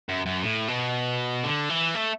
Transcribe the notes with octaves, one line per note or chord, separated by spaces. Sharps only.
F#2
F#2
A2
B2
D3
E3
A3